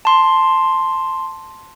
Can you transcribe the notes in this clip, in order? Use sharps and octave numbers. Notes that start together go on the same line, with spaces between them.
A5 C6